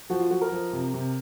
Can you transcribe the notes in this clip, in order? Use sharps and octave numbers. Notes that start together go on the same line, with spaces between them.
F3 F#4
F4
F3 F#4
A#4
F3
C3
C3